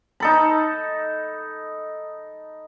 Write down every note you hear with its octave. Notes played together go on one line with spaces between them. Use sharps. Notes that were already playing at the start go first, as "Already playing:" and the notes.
D#4 A4 B5